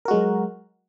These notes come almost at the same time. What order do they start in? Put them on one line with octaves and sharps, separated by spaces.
A#4 F#4 G#3 F#3